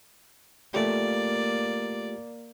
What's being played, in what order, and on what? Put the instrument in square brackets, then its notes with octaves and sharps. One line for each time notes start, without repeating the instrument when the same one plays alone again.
[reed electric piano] A3 F4 G4 [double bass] A#3 [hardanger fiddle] D5